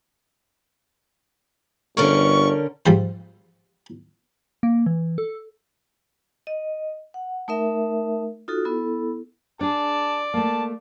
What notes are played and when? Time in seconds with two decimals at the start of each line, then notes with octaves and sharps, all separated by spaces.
1.97 G1 D3 C#4 A#4 C#6
2.86 G#2 F3 G3 C5
4.63 A#3
4.86 E3
5.18 A4
6.47 D#5
7.14 F#5
7.48 A3 D#4 A#4 E5
8.48 D#4 F4 F#4 A4
8.65 B3 E4 A4
9.61 D4 G#4 D5 A5
10.34 A3 A#3 A5